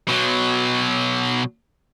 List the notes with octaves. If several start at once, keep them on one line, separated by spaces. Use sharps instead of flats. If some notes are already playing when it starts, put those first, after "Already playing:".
B2 F#3